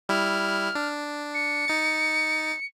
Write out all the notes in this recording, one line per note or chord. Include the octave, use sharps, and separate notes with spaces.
G3 E4 F6
D4
C#7
D#4 A6